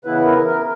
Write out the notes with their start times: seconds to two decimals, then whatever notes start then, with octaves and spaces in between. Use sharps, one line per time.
0.05 C#3 E3 B3 E4 B4
0.25 A#4
0.46 A#4